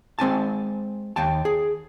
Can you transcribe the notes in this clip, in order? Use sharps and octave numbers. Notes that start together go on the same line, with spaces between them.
G#3 C4 G#5 A5
D#2 G5 A5
G#4